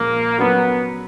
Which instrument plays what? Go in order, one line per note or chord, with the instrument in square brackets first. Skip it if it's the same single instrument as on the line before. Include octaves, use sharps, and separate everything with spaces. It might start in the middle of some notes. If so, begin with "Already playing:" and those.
Already playing: [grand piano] A#2 F3 G#3 C#4 [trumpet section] A#3
[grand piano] F#3 C#4 F#4 A#4 [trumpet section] B3